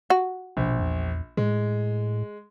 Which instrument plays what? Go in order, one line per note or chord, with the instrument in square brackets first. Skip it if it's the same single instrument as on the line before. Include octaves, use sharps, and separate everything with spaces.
[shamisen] F#4
[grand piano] A#1 [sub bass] B2
[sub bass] E2
[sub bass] A2 [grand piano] G#3